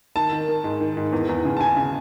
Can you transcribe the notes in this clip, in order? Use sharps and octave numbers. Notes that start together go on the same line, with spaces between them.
D#3 A5
D#3
D#3
G#2
D#3
G#2
E2
E2
C#3
A5
C#3 G#5
C#3